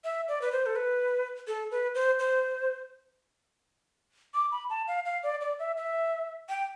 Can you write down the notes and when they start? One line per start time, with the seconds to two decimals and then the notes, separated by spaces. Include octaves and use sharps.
0.04 E5
0.28 D5
0.42 B4
0.52 C5
0.66 A4
0.76 B4
1.47 A4
1.71 B4
1.95 C5
2.19 C5
4.34 D6
4.52 B5
4.70 A5
4.87 F5
5.05 F5
5.23 D5
5.41 D5
5.59 E5
5.77 E5
6.49 G5